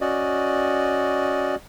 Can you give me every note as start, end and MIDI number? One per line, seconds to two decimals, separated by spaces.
0.01 1.55 61
0.01 1.55 66
0.01 1.55 74
0.01 1.55 75